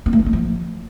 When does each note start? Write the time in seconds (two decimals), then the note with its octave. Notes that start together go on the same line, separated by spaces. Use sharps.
0.06 B3
0.13 A3
0.19 D4
0.26 A3
0.33 F3